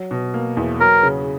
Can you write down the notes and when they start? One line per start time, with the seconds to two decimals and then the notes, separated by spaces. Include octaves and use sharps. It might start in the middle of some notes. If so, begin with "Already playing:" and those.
Already playing: F#3
0.11 B2
0.34 A#3
0.57 E2
0.80 F#3 A#4
1.03 C#3